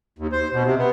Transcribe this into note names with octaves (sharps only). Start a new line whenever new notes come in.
D#2
C5
B2
C3
B3